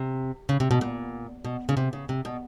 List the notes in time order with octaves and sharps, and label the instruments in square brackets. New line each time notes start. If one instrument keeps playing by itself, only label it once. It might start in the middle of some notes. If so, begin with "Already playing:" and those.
Already playing: [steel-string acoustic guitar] C3
C#3
C3
B2
A#2
B2
C#3
C3
C#3
C3
B2